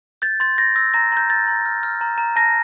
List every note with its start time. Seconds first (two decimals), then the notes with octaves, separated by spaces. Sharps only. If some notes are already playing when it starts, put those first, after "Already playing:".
0.22 G6 A6
0.40 C6 A6
0.58 G6 A#6
0.76 E6 A#6
0.94 A#5 A#6
1.12 A#5 G6
1.29 F6 A6
1.48 A#5
1.65 F6
1.83 F6
2.01 A#5
2.18 A#5
2.36 A5 A#6